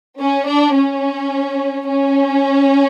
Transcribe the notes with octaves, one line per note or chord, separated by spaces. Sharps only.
C#4
D4
C#4
C#4